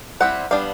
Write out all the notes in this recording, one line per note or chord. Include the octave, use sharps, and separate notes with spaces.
G3 C4 E4 F#5
G3 B3 D4 F5